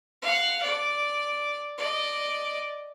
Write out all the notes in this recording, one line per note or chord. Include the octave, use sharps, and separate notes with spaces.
F5 F#5
D5
D5 D#5